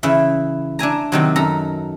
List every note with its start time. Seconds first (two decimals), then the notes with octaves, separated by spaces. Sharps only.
0.03 C#3 E3 E4 E5
0.79 D4 E5 G#5 A#5
1.12 C3 D#3 F#3
1.36 F#2 A4 A#5